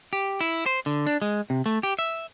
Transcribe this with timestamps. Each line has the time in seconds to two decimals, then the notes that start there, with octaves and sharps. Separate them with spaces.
0.13 G4
0.41 E4
0.66 C5
0.86 D3
1.07 D4
1.22 G#3
1.50 C3
1.66 A3
1.83 G4
1.99 E5